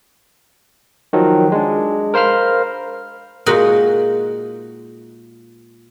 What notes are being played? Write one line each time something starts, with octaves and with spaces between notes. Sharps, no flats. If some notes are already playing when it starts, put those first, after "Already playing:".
D#3 F3 F#3
G#3 D4
A#4 C5 F5 B5 F6
A#2 G#3 D#4 F#4 F#5